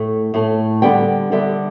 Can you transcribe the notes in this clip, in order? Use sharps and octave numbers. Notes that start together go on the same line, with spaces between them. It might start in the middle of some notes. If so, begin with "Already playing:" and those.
Already playing: A2 A3
A2 A3
D3 G3 B3 G5
D3 G3 B3 E5